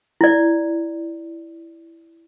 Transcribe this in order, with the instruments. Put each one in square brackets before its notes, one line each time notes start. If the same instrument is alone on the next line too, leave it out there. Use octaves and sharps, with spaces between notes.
[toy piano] E4 D5